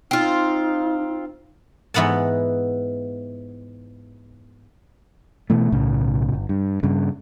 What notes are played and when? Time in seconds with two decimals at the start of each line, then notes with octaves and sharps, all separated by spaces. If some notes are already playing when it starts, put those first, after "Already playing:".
0.11 C4 D#4 F4
1.94 G#2 E3 B3 F#5 A5
5.50 B2 E3 A3
5.72 B1 A2 C#3
6.34 G1
6.49 G2
6.83 G2 C#3